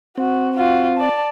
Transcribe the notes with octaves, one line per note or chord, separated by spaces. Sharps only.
C4 F#4
F4 F#4
D5 A5